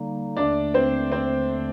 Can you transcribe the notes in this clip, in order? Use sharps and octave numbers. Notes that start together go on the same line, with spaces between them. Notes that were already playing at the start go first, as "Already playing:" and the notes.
Already playing: D3 G3 A#3 D#4
D#2 D3 A3 D4 D5
C4 C5
C4 C5